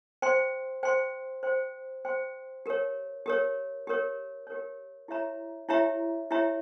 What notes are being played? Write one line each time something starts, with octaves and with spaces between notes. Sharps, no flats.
C5 G5 C6
C5 G5 C6
C5 G5 C6
C5 G5 C6
G4 A#4 C#5
G4 A#4 C#5
G4 A#4 C#5
G4 A#4 C#5
E4 G4 C#5 E5 A#5
E4 G4 C#5 E5 A#5
E4 G4 C#5 E5 A#5